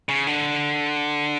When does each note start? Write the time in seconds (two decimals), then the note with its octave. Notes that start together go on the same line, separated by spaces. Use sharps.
0.09 C#3
0.27 D3